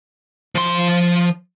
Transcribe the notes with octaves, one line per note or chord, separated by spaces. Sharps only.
F3 C6